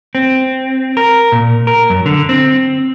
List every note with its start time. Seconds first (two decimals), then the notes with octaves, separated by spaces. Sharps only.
0.15 C4
0.97 A#4
1.32 A#2
1.67 A#4
1.90 F#2
2.06 D3
2.29 C4